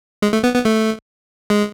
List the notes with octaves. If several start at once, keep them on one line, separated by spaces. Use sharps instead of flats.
G#3
A3
B3
B3
A3
G#3